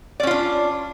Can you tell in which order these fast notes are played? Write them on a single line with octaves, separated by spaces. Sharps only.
D5 C#4 F4 D4